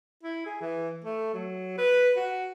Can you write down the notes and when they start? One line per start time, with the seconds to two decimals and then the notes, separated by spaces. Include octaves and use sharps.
0.23 E4
0.46 G#4
0.61 E3
1.04 A3
1.34 F#3
1.78 B4
2.17 F#4